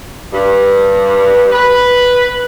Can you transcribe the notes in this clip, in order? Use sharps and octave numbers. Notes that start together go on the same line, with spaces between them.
G2
B4